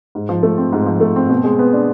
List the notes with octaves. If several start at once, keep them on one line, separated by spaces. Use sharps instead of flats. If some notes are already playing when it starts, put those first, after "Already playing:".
G#2
F3
A3
C4
G#2
F3
A3
C4
B2
G#3
B3
D4